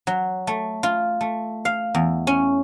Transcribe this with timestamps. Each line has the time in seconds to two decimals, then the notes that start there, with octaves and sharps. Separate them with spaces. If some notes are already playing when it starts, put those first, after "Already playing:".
0.07 F#3
0.47 A3
0.83 F4
1.21 A3
1.65 F5
1.95 E2
2.27 C#4